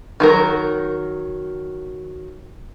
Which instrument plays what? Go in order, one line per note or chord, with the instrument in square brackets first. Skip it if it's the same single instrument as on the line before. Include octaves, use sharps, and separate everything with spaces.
[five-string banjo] D#3 F#3 A#4